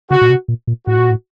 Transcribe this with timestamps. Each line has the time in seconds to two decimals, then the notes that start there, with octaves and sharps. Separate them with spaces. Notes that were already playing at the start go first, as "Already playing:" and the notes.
0.11 C#3 F#4
0.21 A#2
0.30 C3
0.48 A#2
0.67 A#2
0.87 A2 F#4
0.98 A#2
1.10 A2